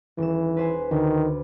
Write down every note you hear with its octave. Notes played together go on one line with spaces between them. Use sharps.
D#1 E3 E7
B4 C5 G#5
D2 D#3